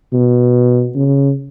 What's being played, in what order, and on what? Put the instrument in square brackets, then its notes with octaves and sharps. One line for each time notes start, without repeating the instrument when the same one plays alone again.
[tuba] B2
C#3